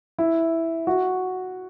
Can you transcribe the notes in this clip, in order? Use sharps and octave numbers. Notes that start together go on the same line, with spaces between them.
E4
F#4